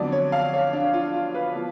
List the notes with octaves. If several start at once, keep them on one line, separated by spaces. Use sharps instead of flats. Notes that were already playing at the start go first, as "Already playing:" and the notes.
Already playing: F2 D3 F#3 B3 D5
C#5
F5
C#5
D4
F4
F4
B4
F3 B3